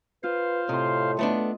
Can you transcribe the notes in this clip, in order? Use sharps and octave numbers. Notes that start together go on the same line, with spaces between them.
F4 B4 C5 F5
A2 C3 D#5 C6
A3 B3 D4 D#5